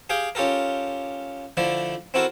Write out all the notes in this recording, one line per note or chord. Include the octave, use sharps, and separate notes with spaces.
G4 G#4 F5 G5
C#4 F4 G4 A4 A#4
D3 F3 A3 E4 D5
C4 E4 F#4 A4 A#4